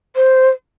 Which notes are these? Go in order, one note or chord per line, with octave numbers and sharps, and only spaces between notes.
C5